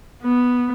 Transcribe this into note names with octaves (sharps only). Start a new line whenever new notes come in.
B3